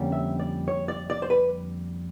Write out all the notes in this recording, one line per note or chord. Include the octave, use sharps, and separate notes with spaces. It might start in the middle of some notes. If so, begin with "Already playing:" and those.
Already playing: F2 D3 G3 A#3 C#4
E5
D5
C#5
D5
D5
C5
B4